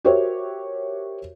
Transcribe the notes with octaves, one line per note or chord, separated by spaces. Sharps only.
F#4 G4 A#4 C5 C#5 E5